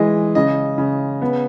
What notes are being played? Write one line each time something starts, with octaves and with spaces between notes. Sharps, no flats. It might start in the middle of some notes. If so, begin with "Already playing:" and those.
Already playing: E3 G#3 D#5
C#3 D#5
C#3
B3